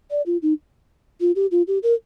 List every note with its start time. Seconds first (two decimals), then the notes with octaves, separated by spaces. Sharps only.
0.11 D5
0.26 F4
0.42 D#4
1.21 F4
1.36 G4
1.51 F4
1.67 G4
1.83 A#4